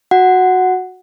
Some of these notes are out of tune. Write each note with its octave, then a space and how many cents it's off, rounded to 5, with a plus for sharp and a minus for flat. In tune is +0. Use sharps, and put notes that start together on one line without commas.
F#4 -10 F#5 +0